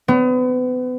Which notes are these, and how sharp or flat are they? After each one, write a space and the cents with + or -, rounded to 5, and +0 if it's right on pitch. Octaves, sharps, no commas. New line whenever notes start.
B3 +35